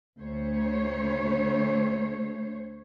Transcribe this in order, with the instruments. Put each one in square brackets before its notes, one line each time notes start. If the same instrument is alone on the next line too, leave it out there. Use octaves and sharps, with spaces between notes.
[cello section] D2 A3 C5 C#5